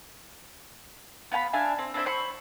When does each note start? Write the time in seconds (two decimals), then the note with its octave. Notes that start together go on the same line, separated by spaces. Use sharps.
1.32 B3 F5 G#5 B5
1.53 D4 E5 F5 G#5
1.79 C4
1.94 C4 D4 E4 C5
2.06 C5 B5 C#6